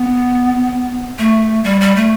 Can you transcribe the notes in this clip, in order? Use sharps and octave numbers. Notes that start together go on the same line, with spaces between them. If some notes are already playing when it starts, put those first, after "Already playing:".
Already playing: B3
A3
G3
G3
A3